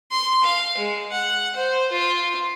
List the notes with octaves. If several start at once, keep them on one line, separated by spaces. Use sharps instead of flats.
C6
F5
G#3
F#5
C5
F4